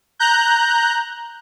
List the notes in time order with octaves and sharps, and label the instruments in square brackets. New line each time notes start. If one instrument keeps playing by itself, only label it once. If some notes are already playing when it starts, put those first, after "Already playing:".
[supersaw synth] A#5 F#6 G6